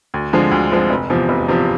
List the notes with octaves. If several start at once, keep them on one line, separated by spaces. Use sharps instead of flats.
D2
D3 F3 G#3 C4
D2
D3 F3 G#3 C4
F1
E2 C3 F3
F1
E2 C3 F3